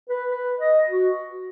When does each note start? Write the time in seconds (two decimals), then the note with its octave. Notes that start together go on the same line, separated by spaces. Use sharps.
0.09 B4
0.31 B4
0.60 D#5
0.89 F#4